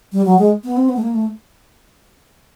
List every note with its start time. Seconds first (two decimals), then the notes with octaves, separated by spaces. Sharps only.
0.13 G3
0.25 F#3
0.38 G#3
0.64 B3
0.77 C4
0.89 B3
0.96 A3
1.02 A#3
1.14 A3